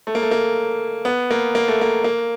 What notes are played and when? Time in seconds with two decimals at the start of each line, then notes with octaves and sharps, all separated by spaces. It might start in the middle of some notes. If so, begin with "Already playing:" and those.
0.07 A3
0.15 A#3
0.23 A3
0.31 A#3
1.05 B3
1.30 A#3
1.55 A#3
1.68 A3
1.81 A#3
2.04 A#3